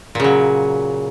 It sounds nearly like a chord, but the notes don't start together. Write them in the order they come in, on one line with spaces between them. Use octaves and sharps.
A#2 C#3 F#3